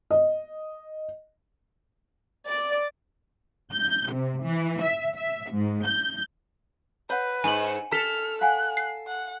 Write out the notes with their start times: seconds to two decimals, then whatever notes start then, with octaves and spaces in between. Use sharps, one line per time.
0.11 D#5
2.47 D5
3.73 G6
4.12 C3
4.44 E3
4.82 E5
5.18 E5
5.52 G#2
5.86 G6
7.10 B4 C#5 F#5
7.44 G#2 G#5 F#7
7.92 A4 F6 B6
8.41 F5 F#5 G#5 F#6
8.77 C7
9.07 F#5